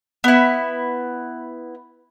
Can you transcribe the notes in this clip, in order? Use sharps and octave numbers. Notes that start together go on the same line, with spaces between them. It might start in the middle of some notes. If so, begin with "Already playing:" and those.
B3 E4